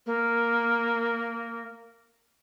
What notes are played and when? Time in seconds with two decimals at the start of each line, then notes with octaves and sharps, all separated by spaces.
0.06 A#3